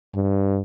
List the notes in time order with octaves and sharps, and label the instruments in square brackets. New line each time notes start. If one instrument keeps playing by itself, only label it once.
[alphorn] G2